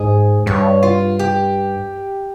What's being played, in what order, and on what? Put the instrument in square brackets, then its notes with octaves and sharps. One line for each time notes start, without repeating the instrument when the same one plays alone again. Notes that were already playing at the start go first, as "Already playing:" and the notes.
Already playing: [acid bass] G#2 [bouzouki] G#4
[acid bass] G2 [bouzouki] C#5
[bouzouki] F4
G4